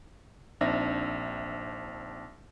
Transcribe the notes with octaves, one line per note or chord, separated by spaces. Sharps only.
A#1 C4 D4 D#4 E5 A#6